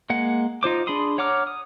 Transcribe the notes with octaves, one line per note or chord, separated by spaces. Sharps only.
G#3 A#3 F#5
D#4 F4 C5 D6
D4 G#4 B5 C6 D#6
C#5 F#5 A#5 D6 F6
D#6